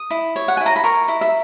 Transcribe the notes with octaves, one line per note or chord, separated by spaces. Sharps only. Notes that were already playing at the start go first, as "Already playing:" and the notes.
Already playing: D#6
E4
C#5
F#5
E4 G#5
A#5
B5
A#4 C#6
E4
E5